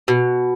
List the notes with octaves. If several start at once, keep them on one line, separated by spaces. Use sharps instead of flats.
B2